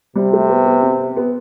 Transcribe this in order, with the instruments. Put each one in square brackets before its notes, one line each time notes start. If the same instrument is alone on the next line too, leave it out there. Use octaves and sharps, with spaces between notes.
[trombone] C3 [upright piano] G3
[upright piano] A3
B3
B3
C4
B3